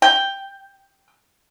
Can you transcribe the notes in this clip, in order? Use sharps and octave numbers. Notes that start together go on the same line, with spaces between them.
G5